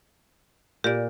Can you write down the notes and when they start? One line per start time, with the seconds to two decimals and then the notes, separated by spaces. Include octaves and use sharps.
0.84 A#2 G4 D5